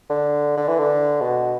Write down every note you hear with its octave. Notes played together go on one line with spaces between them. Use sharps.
D3
D3
E3
D3
B2